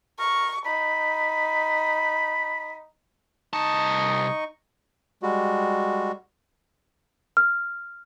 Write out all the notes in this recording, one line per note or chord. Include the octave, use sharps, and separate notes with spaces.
A#4 C#6
D#4 B5
C2 D#4 D#5 A5 C#6
G3 G#3 F#4
F6